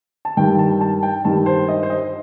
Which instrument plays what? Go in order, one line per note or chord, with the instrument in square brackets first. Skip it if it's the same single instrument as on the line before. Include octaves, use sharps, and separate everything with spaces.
[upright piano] A5
G2 D#3 G3 G5
A5
A5
G5
G2 D#3 G3 A5
C5
D#5
C5
D#5